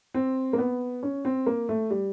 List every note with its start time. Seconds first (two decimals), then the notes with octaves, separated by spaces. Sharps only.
0.14 C4
0.53 A#3
0.58 B3
1.03 C#4
1.25 C4
1.46 A#3
1.69 A3
1.91 G3